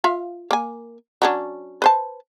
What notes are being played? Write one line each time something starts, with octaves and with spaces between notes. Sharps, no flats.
F4 E5 F5
A#3 G#5
F#3 C#4 D4
B4 C5 A5